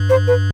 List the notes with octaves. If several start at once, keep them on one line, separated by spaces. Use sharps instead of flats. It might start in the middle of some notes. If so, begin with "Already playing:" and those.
Already playing: G2
C5
B4